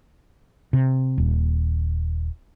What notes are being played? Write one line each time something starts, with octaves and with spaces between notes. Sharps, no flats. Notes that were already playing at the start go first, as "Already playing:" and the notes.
C3
D#1